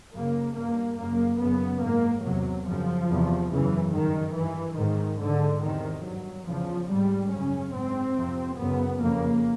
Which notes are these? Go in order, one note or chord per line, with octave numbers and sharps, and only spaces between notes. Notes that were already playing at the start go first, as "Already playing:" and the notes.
F#2 C#3 A#3
G2 A#3
F#2 C#3 A#3
F#2 C#3 B3
G#2 A#3
E2 C3 F#3
F#2 C#3 F3
E2 C3
F#2 C#3 E3
G2 D#3
G2 E3
G#2 D#3
G#2 D3
E2 C3 D#3
G2 F#3
E2 C#3 F3
G#2 G3
F#2 C#3 C#4
G#2 C4
F2 C3
F#2 C#3 B3
F2 C#3 A#3